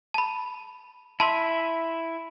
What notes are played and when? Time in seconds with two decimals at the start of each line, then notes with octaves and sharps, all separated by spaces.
0.14 A5 B5
1.20 E4 E5 A5 C6